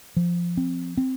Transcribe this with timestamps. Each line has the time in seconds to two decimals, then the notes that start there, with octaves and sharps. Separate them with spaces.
0.17 F3
0.57 C4
0.97 C4